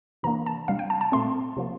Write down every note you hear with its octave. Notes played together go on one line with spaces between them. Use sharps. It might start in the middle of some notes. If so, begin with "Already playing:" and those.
C3 E3 A#3 D4 A#5
A5
C3 G3 D4 F5
G5
A5
A5
A#2 A3 C4 C6
C3 F3 A#3